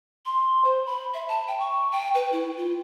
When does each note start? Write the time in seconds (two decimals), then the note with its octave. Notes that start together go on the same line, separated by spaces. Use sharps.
0.26 C6
0.65 C5
0.86 B5
1.14 E5
1.28 A5
1.48 G5
1.60 C#6
1.92 G5
2.15 B4
2.33 E4
2.57 F4